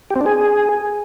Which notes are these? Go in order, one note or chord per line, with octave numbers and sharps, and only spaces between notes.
G4
C4
D4
G#4